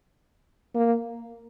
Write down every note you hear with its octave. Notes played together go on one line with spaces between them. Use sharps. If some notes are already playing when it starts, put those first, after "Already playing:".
A#3